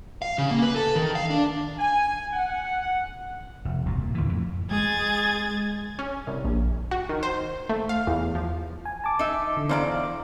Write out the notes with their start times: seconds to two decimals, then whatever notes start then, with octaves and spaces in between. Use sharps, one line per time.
0.22 F5
0.38 C#3
0.51 A#3
0.62 B4
0.76 A4
0.95 D#3
1.15 F5
1.30 D4
1.78 G#5
2.33 F#5
3.65 F1
3.86 D#1 C2 B2
3.99 A#2
4.15 D2 A2 E3
4.29 F2
4.71 G#3 G#4 G#6 A6
5.99 C#4
6.27 C2
6.45 A#1
6.91 F#4
7.09 D#3
7.23 C5
7.69 A3
7.89 F5
8.07 E2
8.35 F3
8.85 G#5
9.04 A5 D6
9.19 D#4 E5
9.57 D3
9.69 E2 D4 C5 D5 F5 A#5